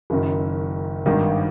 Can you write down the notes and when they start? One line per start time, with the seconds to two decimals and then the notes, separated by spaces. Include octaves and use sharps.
0.10 F#1 F#2 D#3
1.06 G#1 G2 D#3